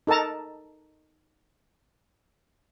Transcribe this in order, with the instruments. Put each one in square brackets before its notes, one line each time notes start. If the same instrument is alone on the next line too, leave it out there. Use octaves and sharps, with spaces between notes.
[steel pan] D#4 A4 A#4 A5 A#5